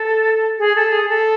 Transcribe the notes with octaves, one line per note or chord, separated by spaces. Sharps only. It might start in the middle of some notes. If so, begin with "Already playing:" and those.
Already playing: A4
G#4
A4
G#4
A4